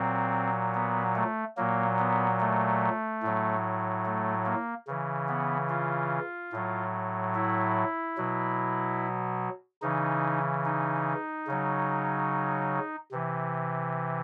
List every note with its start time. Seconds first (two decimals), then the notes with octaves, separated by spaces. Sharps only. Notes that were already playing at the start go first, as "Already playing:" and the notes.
Already playing: A#2 F#3 C4
0.75 B3
1.16 A3
1.57 A#2 F#3 A#3
1.99 B3
2.41 A3
3.23 A2 F#3
4.05 A3
4.46 A#3
4.87 C#3 E3
5.29 B3
5.69 F4
6.52 A2 F#3
7.35 E4
8.18 B2 F#3
9.82 C#3 E3 D#4
10.65 D#4
11.47 C#3 F#3
13.12 C3 E3